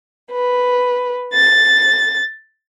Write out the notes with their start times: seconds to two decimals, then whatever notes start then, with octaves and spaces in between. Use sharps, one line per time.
0.31 B4
1.33 A6